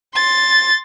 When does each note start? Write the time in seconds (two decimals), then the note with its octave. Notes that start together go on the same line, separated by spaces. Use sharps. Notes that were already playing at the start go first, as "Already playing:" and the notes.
0.14 C6 A6